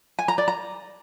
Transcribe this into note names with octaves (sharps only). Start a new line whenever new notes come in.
G#5
A#5
D5
A#5